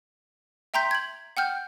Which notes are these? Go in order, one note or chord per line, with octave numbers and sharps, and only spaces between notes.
E5 G5 A#5 C6 G6 B6
G#6 F#7
F#5 G5 F6 G6